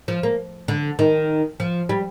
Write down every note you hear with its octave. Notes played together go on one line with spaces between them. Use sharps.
F3
A#3
D3
D#3
F3
G3